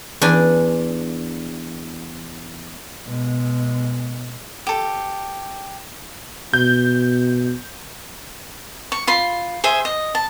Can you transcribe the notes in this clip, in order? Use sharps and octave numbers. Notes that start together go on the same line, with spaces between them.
E2 D4 G#5
B2 G#3
G4 A4
B2 G6
C#6
F4 B5 C6
G#4 C5 E5
D#5
A5